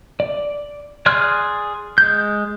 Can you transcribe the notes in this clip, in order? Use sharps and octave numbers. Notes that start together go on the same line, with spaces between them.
D5
G#4 D5 C6 F6 F#6
G#3 G6